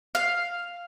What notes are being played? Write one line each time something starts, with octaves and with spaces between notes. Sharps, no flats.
F5